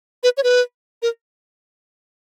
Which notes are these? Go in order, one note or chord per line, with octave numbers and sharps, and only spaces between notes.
B4
C#5
B4
A#4